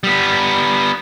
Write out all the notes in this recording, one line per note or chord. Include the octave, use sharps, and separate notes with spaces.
G3 B3